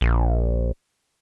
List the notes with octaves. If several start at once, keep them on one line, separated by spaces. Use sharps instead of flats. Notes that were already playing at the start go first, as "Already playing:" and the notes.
A#1